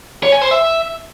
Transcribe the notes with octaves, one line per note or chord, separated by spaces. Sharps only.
C#5
G#5
C5
E5